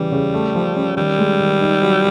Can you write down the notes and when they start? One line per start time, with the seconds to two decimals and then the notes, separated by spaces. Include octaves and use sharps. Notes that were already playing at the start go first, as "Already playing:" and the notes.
Already playing: C#3 E3 G3
0.11 C#3
0.34 A3
0.55 F3
0.76 C#4
0.97 D#3 G3
1.19 G#3
1.40 D#3
1.60 D#4
1.82 F#3